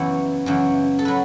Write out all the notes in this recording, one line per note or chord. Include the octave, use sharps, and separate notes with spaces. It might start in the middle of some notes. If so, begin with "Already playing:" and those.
Already playing: F#2 C#3 E3 B3 C#5
F#2 C#3 E3
A4
F#3 B4